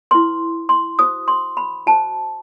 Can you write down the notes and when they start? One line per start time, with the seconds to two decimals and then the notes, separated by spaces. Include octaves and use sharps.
0.11 E4 B4 C6
0.69 C6
0.99 F#4 C5 D#6
1.28 C6
1.57 B5
1.86 F#4 C5 A5